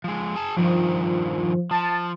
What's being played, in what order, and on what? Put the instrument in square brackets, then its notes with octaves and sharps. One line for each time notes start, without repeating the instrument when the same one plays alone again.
[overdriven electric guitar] F3 G#3
G#4 A5
[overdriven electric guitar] G2 D#3 [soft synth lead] F3
[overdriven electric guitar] F3 [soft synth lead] A5